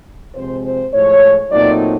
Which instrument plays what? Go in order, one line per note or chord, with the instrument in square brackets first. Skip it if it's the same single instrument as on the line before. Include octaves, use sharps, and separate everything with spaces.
[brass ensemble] C3 F3 G#3 C4 C5
C5
A2 F3 G#3 C#5
A#2 F#3 A3 C4 D#4 D5